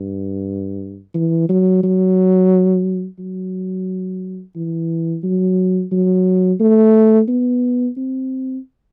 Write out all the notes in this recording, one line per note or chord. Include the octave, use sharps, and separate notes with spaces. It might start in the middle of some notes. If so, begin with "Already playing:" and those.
Already playing: G2
E3
F#3
F#3
F#3
E3
F#3
F#3
A3
B3
C4